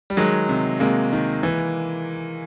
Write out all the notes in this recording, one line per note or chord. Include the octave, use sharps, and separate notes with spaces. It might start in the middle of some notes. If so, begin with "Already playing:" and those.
G3
D#3 F#3 G#3
C3
C3 G#3 A#3
D#3
E3